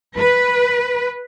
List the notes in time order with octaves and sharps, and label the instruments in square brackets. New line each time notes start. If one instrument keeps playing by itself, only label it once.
[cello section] B4